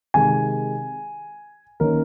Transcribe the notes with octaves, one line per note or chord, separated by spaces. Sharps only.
C3 D#3 G#3 G#5
D#3 A#3 C#4 A#4